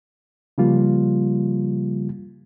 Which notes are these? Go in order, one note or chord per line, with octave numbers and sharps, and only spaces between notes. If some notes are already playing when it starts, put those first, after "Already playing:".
C#3 F3 G3 A#3 F4